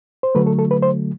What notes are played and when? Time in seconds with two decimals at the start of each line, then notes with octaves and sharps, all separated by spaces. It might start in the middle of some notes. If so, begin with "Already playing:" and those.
0.23 C5
0.35 D3 F#3 A3 B4
0.47 A4
0.59 A4
0.71 B4
0.82 C5